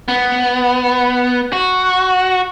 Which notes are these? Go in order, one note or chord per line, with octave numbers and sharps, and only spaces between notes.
B3
F#4